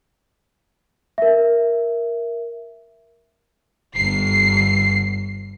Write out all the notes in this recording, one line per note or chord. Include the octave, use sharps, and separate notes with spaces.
A#4 E5
G1 C7